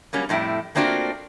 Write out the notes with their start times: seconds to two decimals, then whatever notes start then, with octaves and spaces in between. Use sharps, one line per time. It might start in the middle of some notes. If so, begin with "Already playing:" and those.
0.13 F#3 G3 A#3 C#4
0.29 F2 A2 G3 E4
0.75 A3 A#3 C4 D4 F4 F#4